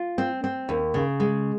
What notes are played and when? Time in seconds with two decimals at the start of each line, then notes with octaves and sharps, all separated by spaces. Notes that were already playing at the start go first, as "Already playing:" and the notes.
Already playing: F4
0.18 C4
0.44 C4
0.69 D#2
0.94 C#3
1.20 G#3